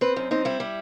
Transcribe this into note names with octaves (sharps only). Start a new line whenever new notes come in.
C4 B4
F#2 D#4
C4 D#4
G3 E4
G3